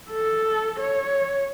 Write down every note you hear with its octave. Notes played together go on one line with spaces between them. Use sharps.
A4
C#5